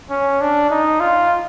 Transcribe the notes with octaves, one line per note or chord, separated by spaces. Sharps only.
C#4
D4
D#4
F4